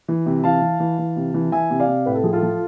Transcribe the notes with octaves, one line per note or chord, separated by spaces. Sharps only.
E3
C3
E3 F5 A5
E3
E3
E3
C3
E3
E3 E5 G#5
C3
D5 F5
C3
A2 B4
A4
F3 G#4
F4 A4
F3